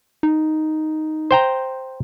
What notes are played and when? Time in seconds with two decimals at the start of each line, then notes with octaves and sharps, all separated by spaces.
0.23 D#4
1.31 C5 G5 A#5